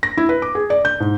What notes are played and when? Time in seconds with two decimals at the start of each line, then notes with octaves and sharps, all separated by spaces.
0.03 A#6
0.17 E4
0.29 B4
0.42 D6
0.55 G#4
0.70 D5
0.85 G6
1.00 G#2